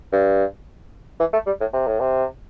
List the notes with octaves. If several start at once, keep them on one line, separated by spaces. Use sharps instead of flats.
G2
E3
A3
G3
A2
C3
A2
C3